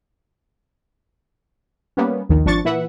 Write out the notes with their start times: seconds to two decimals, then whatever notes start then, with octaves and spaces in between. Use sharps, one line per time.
1.97 G3 A#3 B3 C#4
2.29 A#1 D#2 D#3
2.45 G#1 F3 D4 C#6 A6
2.65 A#2 E3 B4 E5 F#5